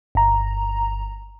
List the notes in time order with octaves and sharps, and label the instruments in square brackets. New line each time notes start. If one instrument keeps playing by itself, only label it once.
[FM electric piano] G1 A#5